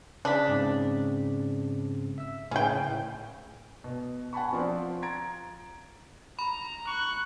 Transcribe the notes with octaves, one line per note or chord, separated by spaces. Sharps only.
C#3 D4 B6
G#2 C#3 C4
E5 E6
A2 C#3 C#4 G5
B2
F#5 G#5 A5 B5 C#6
F3 C4 F4 D5
A#5 G#6 A6 D7
A#5 B5
C#6 F#6